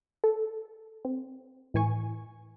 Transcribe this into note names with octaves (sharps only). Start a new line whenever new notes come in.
A4
C4
A2 E3 G#5 C#6